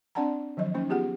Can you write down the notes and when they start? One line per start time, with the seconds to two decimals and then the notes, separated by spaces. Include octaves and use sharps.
0.15 C4 D4 D5 F#5 A5 A#5
0.57 D#3 F3 F#3 D#5
0.74 A#3 C#4 D#4 C5
0.89 B3 F4 G4 G#4 F#5